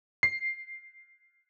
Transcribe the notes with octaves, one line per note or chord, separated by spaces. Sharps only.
C7